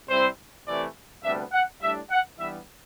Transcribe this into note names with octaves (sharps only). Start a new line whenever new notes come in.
C3 G3 C4 E4 C5
C3 E3 A3 D5
D2 C3 G3 B3 D4 E5
F#5
A2 G3 D4 E5
F#5
G2 E3 G3 B3 E5